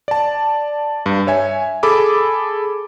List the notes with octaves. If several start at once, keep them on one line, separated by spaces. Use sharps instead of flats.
D5 A5
G2
C#5 E5 G#5
G#4 A4 B5 D6